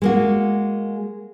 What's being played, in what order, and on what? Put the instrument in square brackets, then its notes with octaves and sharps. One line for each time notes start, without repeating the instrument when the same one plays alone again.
[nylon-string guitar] G#3 A#3 F#4